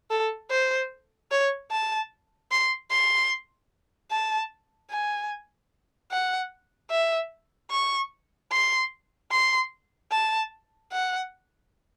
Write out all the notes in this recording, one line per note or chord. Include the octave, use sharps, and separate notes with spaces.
A4
C5
C#5
A5
C6
C6
A5
G#5
F#5
E5
C#6
C6
C6
A5
F#5